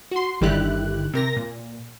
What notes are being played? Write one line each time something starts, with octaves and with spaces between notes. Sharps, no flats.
F#4 C6
G1 D3 D#3 E4 G4 F#6
C3 A#4 A#6
A#2